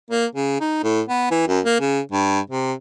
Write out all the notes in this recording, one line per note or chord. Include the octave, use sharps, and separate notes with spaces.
A#3
C#3
D#4
A2
B3
E3
F#2
A#3
C#3
G2
C3